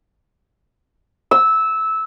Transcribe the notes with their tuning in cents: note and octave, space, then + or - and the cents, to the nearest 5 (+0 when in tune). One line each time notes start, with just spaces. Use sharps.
E6 -15